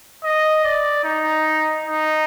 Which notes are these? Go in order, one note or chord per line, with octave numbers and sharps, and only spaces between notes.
D#5
D5
D#4
D#4